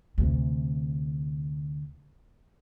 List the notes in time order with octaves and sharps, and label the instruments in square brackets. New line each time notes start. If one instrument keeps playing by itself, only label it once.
[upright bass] D2 C3